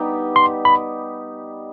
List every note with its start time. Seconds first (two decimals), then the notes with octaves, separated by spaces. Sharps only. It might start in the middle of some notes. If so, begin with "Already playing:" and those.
Already playing: G3 B3 D#4 G4
0.36 C6
0.65 B5